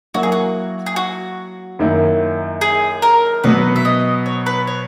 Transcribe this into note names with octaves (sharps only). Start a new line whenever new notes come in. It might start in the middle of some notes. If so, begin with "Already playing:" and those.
F#3 A#3 E4 F#4
G#4
F#4
G#4
F#4
F#2 D#3 A#3 E4
G#4
A#4
B2 F#3 B3 F#4 B4
E5
D#5
C#5
B4
C#5